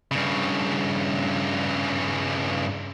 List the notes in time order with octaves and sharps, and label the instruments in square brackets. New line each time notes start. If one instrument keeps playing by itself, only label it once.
[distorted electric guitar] G2 C#3